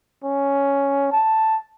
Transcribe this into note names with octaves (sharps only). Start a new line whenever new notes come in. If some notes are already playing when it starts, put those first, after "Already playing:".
C#4
A5